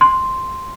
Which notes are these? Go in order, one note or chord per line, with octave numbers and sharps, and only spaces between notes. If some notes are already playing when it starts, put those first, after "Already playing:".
C6